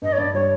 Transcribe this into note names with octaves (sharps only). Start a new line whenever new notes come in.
G2 D#5
C#5
G2 D5
G3 C#5